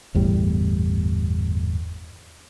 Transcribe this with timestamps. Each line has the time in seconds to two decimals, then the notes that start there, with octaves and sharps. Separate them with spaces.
0.14 G1 E2 A2 G3